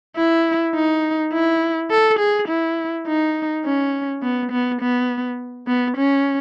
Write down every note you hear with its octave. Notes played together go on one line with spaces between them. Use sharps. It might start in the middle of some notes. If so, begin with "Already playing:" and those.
E4
D#4
E4
A4
G#4
E4
D#4
C#4
B3
B3
B3
B3
C#4